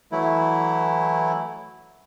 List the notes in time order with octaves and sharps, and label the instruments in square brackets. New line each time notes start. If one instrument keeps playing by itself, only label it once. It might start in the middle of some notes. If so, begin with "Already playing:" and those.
[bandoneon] E3 F#3 A3 E4